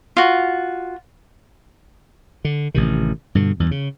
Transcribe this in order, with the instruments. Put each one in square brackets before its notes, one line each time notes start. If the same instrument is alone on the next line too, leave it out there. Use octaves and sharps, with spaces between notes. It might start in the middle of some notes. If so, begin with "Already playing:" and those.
[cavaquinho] F4 F#4
[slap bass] D3
A1 C3 D#3
G2 B2 D3
E2 G2
C#3